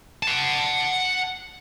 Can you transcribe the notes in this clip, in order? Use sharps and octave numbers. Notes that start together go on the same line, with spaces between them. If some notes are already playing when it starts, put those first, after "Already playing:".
F#5 A5